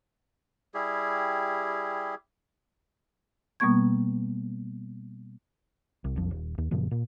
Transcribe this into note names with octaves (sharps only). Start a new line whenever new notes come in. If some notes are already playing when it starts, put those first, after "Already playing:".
G3 E4 G4 G#4
B2 G3 A#3 B3 C#6 G#6
C2
E1 B1 F2 F3
D#1
D#2
F#2 A#2 C#3 F3
A#2